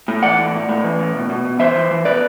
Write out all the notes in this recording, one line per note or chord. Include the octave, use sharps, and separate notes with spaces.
A2
E3 D5 F#5
A2
A2
A2
E3
A2
B2
B2
B2
E3 C5 E5
E3
E3
B2 B4 D5